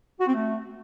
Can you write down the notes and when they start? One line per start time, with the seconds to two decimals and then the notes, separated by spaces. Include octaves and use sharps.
0.20 F#4
0.27 C4
0.34 A3